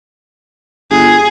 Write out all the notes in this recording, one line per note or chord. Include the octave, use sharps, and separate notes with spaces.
G1 G#4